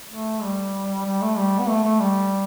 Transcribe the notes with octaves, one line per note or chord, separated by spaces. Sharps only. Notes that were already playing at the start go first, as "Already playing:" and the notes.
A3
G3
G3
A3
G3
B3
A3
A3
G3